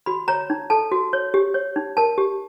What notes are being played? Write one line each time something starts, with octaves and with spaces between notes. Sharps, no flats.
F#4 B5
C#5 A#5
D#4
A4 A5
F#4
C#5
G4
C#5
D#4
A#4 A5
G4